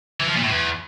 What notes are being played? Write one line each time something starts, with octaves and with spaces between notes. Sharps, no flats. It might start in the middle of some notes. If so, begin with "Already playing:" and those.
E3
F3
A#2
A2
E2